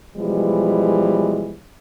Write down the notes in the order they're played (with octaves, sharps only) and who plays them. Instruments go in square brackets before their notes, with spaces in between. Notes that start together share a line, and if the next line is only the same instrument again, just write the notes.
[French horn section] B2 E3 F3 G3 G#3